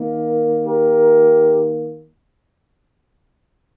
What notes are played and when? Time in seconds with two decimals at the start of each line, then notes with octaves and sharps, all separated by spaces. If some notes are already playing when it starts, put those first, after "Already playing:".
Already playing: D#3 A#3
0.64 G4 A#4